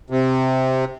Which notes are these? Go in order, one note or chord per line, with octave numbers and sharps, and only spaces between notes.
C3